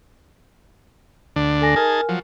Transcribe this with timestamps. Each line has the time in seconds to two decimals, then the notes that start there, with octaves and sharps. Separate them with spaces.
1.36 D2 D3 D4
1.61 A4 G#5 A#6
1.76 D#4 G#4 A#4 G#5 A5 F6
2.09 F3 F#3